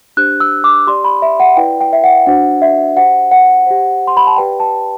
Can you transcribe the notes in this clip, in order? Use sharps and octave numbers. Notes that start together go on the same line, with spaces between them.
D4 G4 C5 F#6
E6
D6
G4 D5 C6
B5
E5
F#5
E4 B4 D5 G5
G5
E5
F#5
D4 F#4 C5 F#5
E5
G4 C5 F#5
F#5
G4 C5
C6
B5
A5
G4 B4 D5 G5
A5